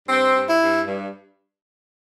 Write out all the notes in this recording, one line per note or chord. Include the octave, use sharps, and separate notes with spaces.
G2 C4
G2
E4
G2
G2